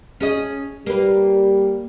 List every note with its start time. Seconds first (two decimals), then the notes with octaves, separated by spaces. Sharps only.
0.20 C#4 G#4 D#5
0.86 G3 A#3 B4